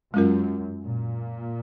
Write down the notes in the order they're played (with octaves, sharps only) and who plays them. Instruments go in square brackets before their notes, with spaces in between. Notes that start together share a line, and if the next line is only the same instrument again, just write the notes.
[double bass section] F#2 [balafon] G#3 C#4 F4 A#4
[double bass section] A#2